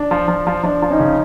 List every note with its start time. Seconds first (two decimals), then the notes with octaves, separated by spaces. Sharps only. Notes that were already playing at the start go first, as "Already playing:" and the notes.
Already playing: D4
0.11 F3
0.28 F3
0.47 F3
0.63 F3 D4
0.82 F3
0.90 C#4 D#4
0.99 C#3